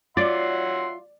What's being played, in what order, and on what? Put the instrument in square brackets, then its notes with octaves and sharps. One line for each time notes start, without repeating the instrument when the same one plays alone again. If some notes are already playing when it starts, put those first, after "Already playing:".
[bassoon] F#3 [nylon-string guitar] F4 [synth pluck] D5 [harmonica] E5 F#5 C6